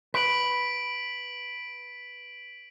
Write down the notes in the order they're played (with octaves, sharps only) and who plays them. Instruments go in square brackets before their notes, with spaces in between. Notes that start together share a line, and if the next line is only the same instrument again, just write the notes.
[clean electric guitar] B4 [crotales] B6 D7 F#7